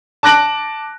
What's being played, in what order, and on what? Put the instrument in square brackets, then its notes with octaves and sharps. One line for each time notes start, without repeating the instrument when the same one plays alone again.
[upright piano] A5 D6 F#6 A#6 D7 F#7